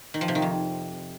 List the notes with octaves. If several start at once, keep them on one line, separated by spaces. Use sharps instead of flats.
D#3
F3
C3
D#3
F2